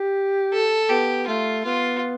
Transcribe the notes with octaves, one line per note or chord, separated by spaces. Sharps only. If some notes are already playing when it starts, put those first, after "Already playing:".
Already playing: G4
A4
B3 G4
A3 F4
B3 F4